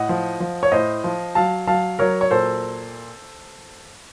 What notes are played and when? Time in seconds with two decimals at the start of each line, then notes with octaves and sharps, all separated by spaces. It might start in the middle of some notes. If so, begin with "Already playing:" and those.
Already playing: A2 D#5 F#5
0.09 F3
0.40 F3
0.63 C#5
0.72 A2 C5 D#5
1.04 F3
1.35 F#3 F5 A5
1.67 F#3 F5 A5
1.99 F#3 A#4 C#5
2.21 C#5
2.31 A#2 A4 C5